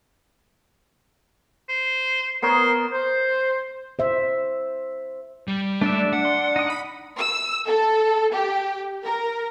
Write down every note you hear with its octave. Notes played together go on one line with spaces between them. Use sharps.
C5
B3 A#4 C5 C#5
C5
C5 E5
G3
A3 D4 D5 E5
F#5
C6
D#4 D#6
B5
E6
A4
G4
A#4